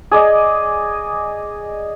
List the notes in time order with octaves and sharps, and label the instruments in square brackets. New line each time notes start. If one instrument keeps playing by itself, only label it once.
[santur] G#4 D5 D#5